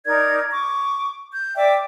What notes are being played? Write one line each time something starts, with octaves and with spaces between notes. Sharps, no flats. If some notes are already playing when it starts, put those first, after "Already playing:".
D#4 A#4 D5 G#6
C#6 D6
G6
D5 E5 G5 D6